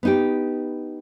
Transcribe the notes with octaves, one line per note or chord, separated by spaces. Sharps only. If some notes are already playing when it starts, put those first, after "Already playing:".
B3 D#4 G4